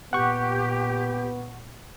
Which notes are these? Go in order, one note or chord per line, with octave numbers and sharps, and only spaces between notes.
A#2 B3 G4 F#5 C#6